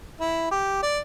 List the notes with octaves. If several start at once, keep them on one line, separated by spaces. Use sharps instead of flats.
E4
G4
D5